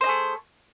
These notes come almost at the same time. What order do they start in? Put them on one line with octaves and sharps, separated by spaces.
C5 D#4 G#4 A3